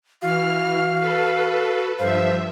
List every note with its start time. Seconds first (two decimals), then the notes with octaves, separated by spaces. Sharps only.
0.22 E3 F#4 F5 F6
0.99 A4 B4
1.99 G2 F3 C5 E5 F5